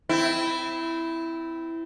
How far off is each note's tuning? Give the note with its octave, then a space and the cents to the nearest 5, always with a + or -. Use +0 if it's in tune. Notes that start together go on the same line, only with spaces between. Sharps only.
C4 -25 E4 +0